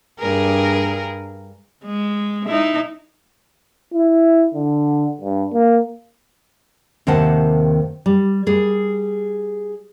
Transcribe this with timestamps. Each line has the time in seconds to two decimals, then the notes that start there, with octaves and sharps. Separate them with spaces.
0.19 G2 G#4 A#4
1.85 G#3
2.46 D#4 E4
3.93 E4
4.54 D3
5.21 G2
5.52 A#3
7.07 D#2 C3 D#3 C5 F#5 A5
8.06 G3
8.47 G3 G#4